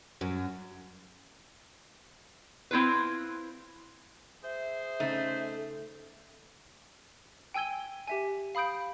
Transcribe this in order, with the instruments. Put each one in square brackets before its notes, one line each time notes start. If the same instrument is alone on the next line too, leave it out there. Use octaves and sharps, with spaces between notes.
[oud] F#2
[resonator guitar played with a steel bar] C4 E4 F4 B4
[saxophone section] G#4 C5 [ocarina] E5
[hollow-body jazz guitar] C#3 D#4 [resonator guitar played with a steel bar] A3
[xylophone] G5 G#5 E6 G#6 G7
G4 E5 G#5
F5 B5 D#6 G6 D7